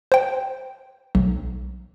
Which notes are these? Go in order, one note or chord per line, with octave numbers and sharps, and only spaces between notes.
C5 G5
B1